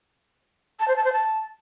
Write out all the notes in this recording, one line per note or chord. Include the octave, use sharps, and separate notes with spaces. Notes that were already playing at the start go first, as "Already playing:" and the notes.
A5
C5
A5
C5
A5